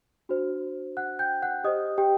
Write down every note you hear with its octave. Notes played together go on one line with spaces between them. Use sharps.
D4 F#4 C5
F#5 F#6
G5 G6
F#5 F#6
G4 C5 D#5 D#6
G4 G5